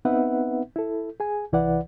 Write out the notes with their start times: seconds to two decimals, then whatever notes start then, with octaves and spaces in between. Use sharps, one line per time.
0.05 B3 C4 D#4 B4 E5 F#5
0.76 E4 A4
1.20 G#4 G#5
1.52 C2 E3 E4 B4 D5 F#5